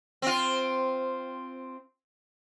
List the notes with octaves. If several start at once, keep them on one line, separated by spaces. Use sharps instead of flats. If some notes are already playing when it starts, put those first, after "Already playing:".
C4 F4